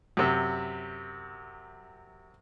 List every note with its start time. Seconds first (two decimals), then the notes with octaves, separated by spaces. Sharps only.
0.17 F#2 C3